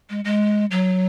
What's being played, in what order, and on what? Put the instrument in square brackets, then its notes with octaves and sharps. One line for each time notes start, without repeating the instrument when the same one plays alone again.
[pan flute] G#3
G#3
F#3